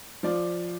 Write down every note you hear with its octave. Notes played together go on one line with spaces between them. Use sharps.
F3 D5